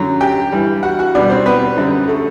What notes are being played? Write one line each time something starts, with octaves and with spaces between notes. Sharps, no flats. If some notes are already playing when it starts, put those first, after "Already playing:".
Already playing: F#2 D3 F#3
G4 G5
G2 E3 G3
F#4 F#5
F#4 F#5
B2 G3 D4 D5
C4 C5
B3 B4
F#2 D3 G3
A3 A4